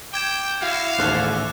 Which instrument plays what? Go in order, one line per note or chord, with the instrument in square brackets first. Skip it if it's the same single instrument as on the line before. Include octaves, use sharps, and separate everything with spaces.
[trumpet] G5 [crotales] D6 G#6 E7
[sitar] E4 F#4 [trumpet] F5
[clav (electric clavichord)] A1 D#2 C5 [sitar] A#2 C#3 A4 [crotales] F#6